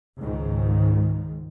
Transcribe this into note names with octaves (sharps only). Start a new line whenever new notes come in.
C#2 G#2 D#3